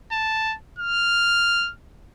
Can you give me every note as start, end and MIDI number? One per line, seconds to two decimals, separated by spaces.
0.12 0.55 81
0.79 1.71 89